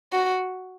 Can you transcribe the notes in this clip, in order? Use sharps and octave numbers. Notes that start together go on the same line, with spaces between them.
F#4